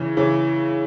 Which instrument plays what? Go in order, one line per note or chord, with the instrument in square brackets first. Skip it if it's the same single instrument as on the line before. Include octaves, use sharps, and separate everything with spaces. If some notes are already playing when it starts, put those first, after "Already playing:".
Already playing: [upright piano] C#3 E3
C#3 E3